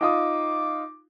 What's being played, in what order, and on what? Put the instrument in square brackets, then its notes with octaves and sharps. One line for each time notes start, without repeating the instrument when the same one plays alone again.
[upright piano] D#4 F4 D#6 [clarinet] D6